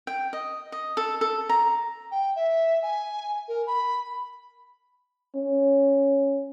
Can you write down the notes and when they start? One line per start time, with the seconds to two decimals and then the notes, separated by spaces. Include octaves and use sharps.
0.07 G5
0.33 D#5
0.72 D#5
0.97 A4
1.21 A4
1.49 A#5
2.11 G5
2.36 E5
2.82 G#5
3.48 A#4
3.67 B5
5.35 C#4